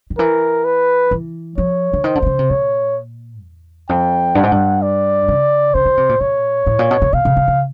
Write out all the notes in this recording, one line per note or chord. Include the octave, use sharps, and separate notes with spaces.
D#3
E3 A#4
B4
E3
F3 C#5
D3
D#3 C5
D3
C3
C#3
C3
A#2 C#5
E2
F2 G5
G2 F#5
G#2
G2
D5
C#3
C#3 C5
D3
C3
A#2
A#2 C#5
A2
A#2
B2
B2
B2 F5
C3
C#3
C#3